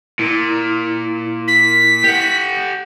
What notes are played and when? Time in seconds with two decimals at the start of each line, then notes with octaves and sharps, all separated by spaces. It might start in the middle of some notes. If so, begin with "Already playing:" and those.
0.19 A#2 E4
1.48 B6
2.04 G4 F#5